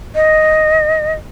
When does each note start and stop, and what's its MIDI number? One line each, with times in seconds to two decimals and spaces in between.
0.15 1.13 75